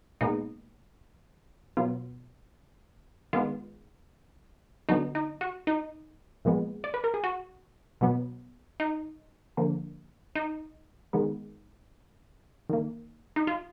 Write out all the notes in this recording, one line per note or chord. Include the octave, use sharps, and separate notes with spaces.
A#2 G#3 B3 D#4
B2 F#3 B3 F4
D#3 G#3 B3 F4
D3 F#3 B3 D#4
D#4
F#4
D#4
A#2 F3 G#3 B3
D5
B4
A#4
G#4
F#4
B2 F#3 B3
D#4
D3 F3 A#3
D#4
D#3 G#3 B3
D#3 A#3
D#4
F4